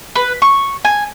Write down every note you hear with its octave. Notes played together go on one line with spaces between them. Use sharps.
B4
C#6
G#5